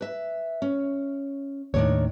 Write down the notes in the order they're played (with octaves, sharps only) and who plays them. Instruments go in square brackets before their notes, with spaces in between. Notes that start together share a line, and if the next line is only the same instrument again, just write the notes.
[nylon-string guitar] B4 E5
C#4
[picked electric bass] D#2 A2 [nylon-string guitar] D#3 D4 C#5